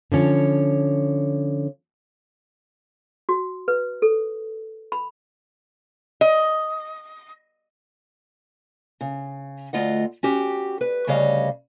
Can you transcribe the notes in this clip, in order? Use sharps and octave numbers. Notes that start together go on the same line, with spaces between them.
D3 F3 C#4 C#5
F#4
B4
A4
B5
D#5
C#3
D2 A3 F4 D#5 F#5
C#4 F#4 G4
B4
D2 C#3 G3 C#5 D#5 F5